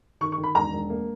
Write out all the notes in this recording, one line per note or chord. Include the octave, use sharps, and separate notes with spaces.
D#3 C#6
C#6
D#3
B5
E1 A#5
E1
A#3